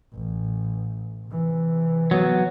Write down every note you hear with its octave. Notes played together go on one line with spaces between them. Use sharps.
A1
C3 E3
F#3 B3